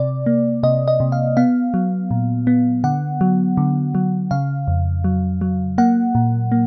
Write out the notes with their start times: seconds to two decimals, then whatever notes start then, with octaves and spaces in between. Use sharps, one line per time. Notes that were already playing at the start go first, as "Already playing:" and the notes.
Already playing: C3 D5
0.26 A#3
0.63 C3 D#5
0.88 D#5
1.00 C3
1.12 F5
1.37 B3 F5
1.74 F#3
2.11 A#2
2.47 B3
2.84 D3 F#5
3.21 F#3
3.57 D3
3.95 F#3
4.31 C#3 F5
4.68 F2
5.04 F#3
5.41 F#3
5.78 A#3 F#5
6.15 A#2
6.52 A#3